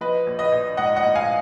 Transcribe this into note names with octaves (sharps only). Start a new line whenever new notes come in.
F3 B4 D#5
A#1
B4 D#5
A#1
G#2 D#5 F#5
D#5 F#5
A#1
F5 G#5